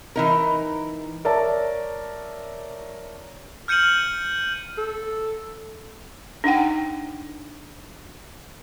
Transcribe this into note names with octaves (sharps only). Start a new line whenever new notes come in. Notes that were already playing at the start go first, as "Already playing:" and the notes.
E3 D#4 A#4
A#4 C#5 D5 E5 A5
F6 G6 C#7 D#7 F#7
A4
D4 D#4 F#5 G5